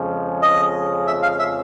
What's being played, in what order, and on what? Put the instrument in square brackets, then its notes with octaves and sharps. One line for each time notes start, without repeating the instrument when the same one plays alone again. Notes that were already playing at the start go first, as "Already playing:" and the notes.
Already playing: [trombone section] F2 C#3 F3 G#3 C#4
[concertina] D#5
E5
F5
E5